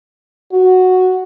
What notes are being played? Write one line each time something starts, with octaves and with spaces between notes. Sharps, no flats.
F#4